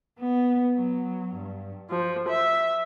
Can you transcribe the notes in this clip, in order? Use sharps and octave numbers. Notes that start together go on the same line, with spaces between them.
B3
F#3
G2
F3
E5